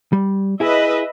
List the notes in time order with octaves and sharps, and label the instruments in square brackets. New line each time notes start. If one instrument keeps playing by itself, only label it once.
[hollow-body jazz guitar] G3
[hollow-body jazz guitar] E4 G#4 [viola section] B4 D#5 E5